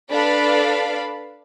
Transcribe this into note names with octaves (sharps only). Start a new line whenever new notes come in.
D4 A4 B4 D5 F5 B5